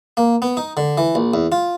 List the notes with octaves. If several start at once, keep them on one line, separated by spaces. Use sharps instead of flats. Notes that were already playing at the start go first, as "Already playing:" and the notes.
A#3
B3
D#4
D3
E3
A#1
E2
F4